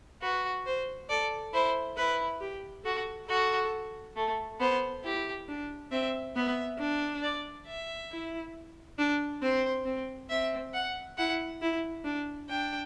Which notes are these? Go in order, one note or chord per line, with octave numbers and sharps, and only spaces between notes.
F#4 B4
C5
A4 D5
E4 C5
E4 B4
G4
F#4 A4
F#4 A4
A3
B3 C5
E4 G4
D4
C4 E5
B3 E5
D4
D5
E5
E4
D4
C4 C5
C4
C4 E5
F#5
E4 F#5
E4
D4
D4 G5